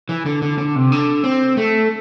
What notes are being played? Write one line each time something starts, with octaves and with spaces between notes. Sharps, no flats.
E3
D3
D3
D3
C3
D3
C4
A3